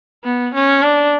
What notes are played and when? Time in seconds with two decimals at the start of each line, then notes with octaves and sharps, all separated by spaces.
0.24 B3
0.54 C#4
0.83 D4